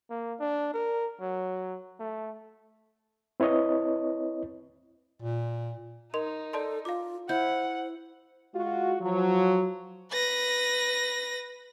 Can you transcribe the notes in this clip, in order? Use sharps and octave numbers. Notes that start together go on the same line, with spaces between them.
A#3
D4
A#4
F#3
A3
C4 E4 B4 C#5 D#5
A#2
D#4 A#4 D#5 C6
A4 D5 A5 C6
F4 F5 D6
E4 C5 F#5 G6
G#3 F4 F#4
F3 F#3
B4 A#6